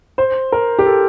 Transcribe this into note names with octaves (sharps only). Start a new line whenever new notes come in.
C5
A#4
G4
A4